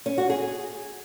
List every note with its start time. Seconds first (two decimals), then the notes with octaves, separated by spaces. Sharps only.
0.06 C#4
0.18 F#4
0.30 G#4